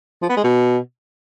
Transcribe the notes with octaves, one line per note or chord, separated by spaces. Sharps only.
F3
B3
G#3
B2